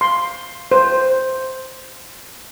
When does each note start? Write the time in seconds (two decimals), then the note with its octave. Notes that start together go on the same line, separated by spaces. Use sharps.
0.01 C6
0.72 C5